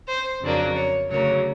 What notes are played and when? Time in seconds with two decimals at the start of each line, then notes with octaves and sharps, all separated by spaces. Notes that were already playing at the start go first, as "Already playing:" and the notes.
0.09 C5
0.42 F2 C#3 F#3 A#3 D4
0.76 C#5
1.10 D2 C#3 F#3 A#3 C#5